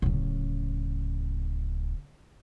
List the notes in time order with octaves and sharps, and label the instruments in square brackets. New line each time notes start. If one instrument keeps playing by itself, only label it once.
[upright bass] D1 C#3